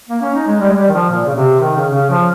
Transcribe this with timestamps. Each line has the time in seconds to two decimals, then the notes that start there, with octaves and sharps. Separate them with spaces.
0.09 A#3
0.21 C#4
0.35 D#4
0.47 G#3
0.60 G3
0.69 G#3
0.76 G3
0.88 D#3
0.93 F3
1.10 A#2
1.26 C#3
1.35 C3
1.60 D#3
1.76 C#3
1.94 C#3
2.10 F3